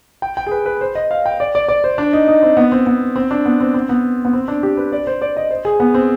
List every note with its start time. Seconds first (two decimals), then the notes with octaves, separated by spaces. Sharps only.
0.22 G5
0.37 G5
0.47 G#4
0.51 B4
0.66 B4
0.81 C5
0.95 D#5
1.11 F5
1.26 G5
1.40 D5
1.55 D5
1.68 D5
1.84 C5
1.98 D4
2.13 D#4
2.28 D#4
2.42 C4
2.57 B3
2.72 C4
2.87 B3
3.16 C4
3.31 D4
3.45 B3
3.60 C4
3.74 C4
3.89 B3
4.25 B3
4.33 C4
4.48 D4
4.63 G4
4.77 B4
4.92 D5
5.07 C5
5.22 D5
5.37 D#5
5.51 C5
5.65 G#4
5.80 B3
5.94 C4